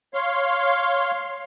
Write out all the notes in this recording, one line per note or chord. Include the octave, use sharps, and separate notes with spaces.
C#5 F5 C6